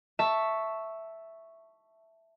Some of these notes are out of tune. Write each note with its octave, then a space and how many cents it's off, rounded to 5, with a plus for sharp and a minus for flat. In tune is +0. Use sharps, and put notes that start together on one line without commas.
E5 +0 A5 +0 C#6 +0